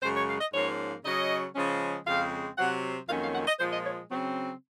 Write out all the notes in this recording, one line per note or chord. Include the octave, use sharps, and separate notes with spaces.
F#2 C#3 G#3 C5
C#5
F5
D#5
G#2 F3 A#3 C#4 C#5
C#3 F#3 C#4 D#5
C#3 F3 G#3 C#4
F2 C#3 G#3 C4 F5
C3 F#3 C4 F#5
F2 D#3 F#3 A#3 C#4 F5
F5
F#5
D#5
A#2 F3 G#3 C5
D#5
C#5
C#3 F#3 C4